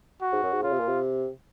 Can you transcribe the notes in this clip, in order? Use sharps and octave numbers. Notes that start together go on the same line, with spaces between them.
F#4
G#2
F#2
G#2
C#3 F4
C3
A#2
C3